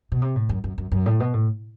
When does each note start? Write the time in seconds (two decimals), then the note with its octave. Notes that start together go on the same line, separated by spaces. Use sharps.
0.12 B2
0.22 C3
0.36 A2
0.49 F#2
0.64 F#2
0.78 F#2
0.92 F#2
1.06 A2
1.20 B2
1.34 A2